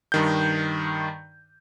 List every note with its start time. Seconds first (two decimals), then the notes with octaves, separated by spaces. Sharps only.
0.12 G2 D#3 G6